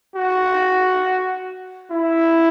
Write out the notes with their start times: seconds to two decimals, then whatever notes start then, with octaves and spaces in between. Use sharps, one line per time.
0.15 F#4
1.91 E4